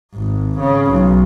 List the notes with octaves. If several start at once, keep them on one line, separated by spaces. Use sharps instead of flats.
G#1
C#3
B1